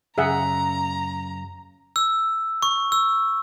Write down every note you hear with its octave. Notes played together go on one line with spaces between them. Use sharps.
F#2 C#3 G#4 E5 F#5 A#5
E6
C#6
E6